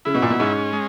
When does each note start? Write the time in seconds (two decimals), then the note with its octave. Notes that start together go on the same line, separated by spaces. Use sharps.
0.05 C#3 E4
0.15 B2
0.22 A#2
0.30 B2
0.40 G#2 C#4
0.73 G#3